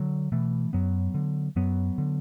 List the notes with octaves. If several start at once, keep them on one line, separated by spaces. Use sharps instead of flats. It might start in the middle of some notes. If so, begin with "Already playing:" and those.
Already playing: D3 F#3
B2 E3 A3
F#2 F#3 B3
D3
F#2 F#3 B3
D3